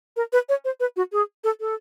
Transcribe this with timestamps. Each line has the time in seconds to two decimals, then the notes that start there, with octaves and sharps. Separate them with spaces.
0.17 A#4
0.33 B4
0.49 C#5
0.65 C5
0.80 B4
0.97 F#4
1.12 G#4
1.44 A4
1.60 A4